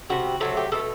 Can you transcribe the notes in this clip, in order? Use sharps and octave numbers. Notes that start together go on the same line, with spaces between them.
C3 G3 F#4
C3 F#3 A3 A4
G4
B2 A3 A4